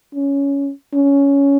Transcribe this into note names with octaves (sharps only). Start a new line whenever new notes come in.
C#4
C#4